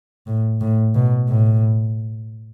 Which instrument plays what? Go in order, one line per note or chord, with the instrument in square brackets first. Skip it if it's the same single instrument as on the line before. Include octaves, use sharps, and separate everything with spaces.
[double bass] A2
A2
B2
A2